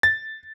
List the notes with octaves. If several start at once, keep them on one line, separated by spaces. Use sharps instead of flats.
A6